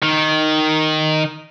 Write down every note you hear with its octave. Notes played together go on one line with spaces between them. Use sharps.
D#3